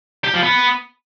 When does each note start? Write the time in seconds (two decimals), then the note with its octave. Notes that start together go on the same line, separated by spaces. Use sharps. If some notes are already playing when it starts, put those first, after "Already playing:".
0.24 G4
0.34 F3
0.43 B3